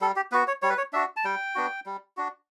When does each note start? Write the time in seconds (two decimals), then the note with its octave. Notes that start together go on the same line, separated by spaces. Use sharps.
0.01 G3 A4
0.16 G4
0.32 B3 F#4 B4
0.47 C#5
0.62 G3 C#5
0.70 B4
0.77 C#5
0.93 D4 F#4 E5
1.16 A5
1.24 G3 G5
1.55 B3 D4 F#4
1.86 G3
2.17 D4 F#4